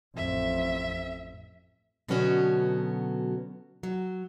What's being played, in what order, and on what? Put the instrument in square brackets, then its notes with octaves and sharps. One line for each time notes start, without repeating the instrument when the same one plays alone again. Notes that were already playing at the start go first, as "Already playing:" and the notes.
[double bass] A1 F2 [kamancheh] E5
[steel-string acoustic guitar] B2 D3 F#3 B3 C#4 F#4
F#3